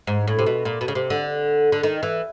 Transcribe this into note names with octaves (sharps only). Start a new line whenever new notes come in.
G#2
A2
C3
B2
A#2
B2
C#3
C3
D3
D3
D#3
E3